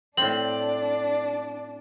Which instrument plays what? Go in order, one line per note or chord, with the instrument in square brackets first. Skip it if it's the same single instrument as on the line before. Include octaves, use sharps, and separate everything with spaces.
[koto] A2 C4 [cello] D4 [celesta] F#7